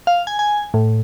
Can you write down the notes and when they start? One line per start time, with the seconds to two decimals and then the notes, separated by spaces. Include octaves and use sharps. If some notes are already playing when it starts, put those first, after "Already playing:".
0.07 F5
0.27 G#5
0.39 G#5
0.74 A2